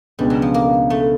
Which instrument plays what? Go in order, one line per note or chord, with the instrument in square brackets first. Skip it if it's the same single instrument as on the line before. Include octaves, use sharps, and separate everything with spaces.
[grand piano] C#2 B2 G#3 B3 D4 [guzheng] G3
[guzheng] F#3
F3
A#3
A3